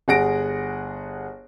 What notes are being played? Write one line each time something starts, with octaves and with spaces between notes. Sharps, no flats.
G1 G#4 F#5 A#6 D7